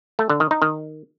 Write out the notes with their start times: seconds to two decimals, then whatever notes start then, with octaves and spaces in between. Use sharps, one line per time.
0.19 A3
0.29 D3
0.40 D#3
0.51 D#4
0.62 D#3